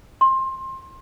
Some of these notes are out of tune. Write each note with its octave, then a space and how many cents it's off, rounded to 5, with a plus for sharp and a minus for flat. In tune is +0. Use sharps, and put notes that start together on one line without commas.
C6 +20